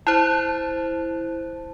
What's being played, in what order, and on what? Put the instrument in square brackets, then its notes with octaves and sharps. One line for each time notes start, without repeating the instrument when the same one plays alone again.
[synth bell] E4 C5 [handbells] A5 F#6